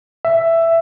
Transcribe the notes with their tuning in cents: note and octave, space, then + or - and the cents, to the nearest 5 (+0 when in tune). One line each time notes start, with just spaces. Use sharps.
E5 +10